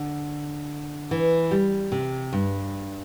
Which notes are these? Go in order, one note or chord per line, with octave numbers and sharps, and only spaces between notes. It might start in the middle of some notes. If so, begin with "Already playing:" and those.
Already playing: D3
E3
G3
C3
G2